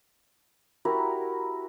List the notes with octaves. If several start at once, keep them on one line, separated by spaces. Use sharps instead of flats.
E4 F#4 G4 A#4